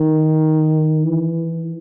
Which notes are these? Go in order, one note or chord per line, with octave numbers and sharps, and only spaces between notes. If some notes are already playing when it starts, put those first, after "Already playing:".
Already playing: D#3
E3